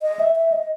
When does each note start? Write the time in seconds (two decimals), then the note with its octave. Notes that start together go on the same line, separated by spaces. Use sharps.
0.02 D#5
0.20 E5
0.36 E5
0.52 D#5